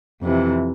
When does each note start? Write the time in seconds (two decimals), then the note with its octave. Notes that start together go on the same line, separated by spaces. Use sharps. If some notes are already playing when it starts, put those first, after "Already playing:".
0.22 F2 C3 E3